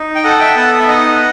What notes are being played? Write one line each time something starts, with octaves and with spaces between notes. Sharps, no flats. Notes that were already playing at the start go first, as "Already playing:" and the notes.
Already playing: D#4
G5
A4 D#5 F#5
E5 G5
B3 F#5 A5
E5
D#4 D#5 F#5